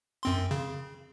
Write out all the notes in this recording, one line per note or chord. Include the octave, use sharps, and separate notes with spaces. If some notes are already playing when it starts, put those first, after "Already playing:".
F#2 C4 C6
C#3